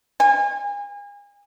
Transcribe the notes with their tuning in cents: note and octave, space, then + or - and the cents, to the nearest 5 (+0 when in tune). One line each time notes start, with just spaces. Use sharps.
G#5 -35